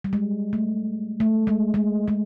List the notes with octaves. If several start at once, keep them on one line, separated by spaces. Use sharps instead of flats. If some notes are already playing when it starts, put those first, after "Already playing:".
G3
G#3
A3
A3
G#3
G#3
G#3